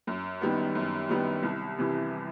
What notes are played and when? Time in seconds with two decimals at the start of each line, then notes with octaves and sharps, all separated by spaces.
0.07 F#2
0.41 D#3 G3 B3
0.75 F#2
1.09 D#3 G3 B3
1.43 C2
1.78 C3 E3